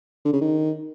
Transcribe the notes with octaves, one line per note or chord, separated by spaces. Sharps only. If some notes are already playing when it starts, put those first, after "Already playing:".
D3
C#3
D#3